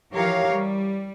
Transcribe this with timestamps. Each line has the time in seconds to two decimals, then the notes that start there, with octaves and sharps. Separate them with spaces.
0.12 E3 F3 G4 A#4 C#5 F5
0.51 G3